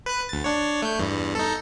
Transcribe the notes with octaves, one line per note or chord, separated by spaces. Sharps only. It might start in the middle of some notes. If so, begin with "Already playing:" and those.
B4 F#6
D2 A6
D4 C#5
A3 G6
E2 G2
D#4 A4